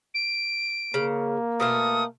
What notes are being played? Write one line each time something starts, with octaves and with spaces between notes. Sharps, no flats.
D7
C#3 A#3
B2 A3 F5 D#6